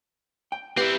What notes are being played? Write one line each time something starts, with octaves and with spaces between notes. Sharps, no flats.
G5
C4 E4 G4 B4